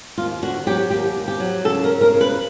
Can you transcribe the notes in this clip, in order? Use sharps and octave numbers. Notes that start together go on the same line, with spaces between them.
D#2 F4
D3 F#4
F#3 G4
D#2 G4
D#2
G4
F#3
C#3 A4
A#4
C#3
A#4
C#3
B4